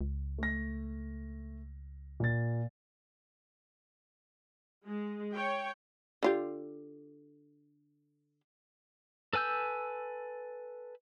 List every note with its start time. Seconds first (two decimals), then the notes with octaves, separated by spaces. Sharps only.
0.01 C#2
0.38 A3 A#6
2.20 A#2 A6
4.85 G#3
5.34 C#5 G5
6.23 D3 F4 G4
9.33 A4 B4 G#5 E6 G6